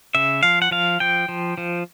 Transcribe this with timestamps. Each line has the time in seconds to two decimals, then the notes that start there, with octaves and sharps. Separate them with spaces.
0.15 C#3 E5
0.43 F3 F5
0.62 F#5
0.71 F3 F5
1.00 F3 G5
1.28 F3
1.58 F3